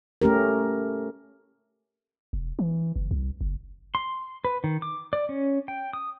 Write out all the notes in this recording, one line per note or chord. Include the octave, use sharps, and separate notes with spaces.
A3 C#4 G4 A#4
E1
E3
F#1
C2
F#1
C6
B4
D#3
D6
D5
C#4
G5
D#6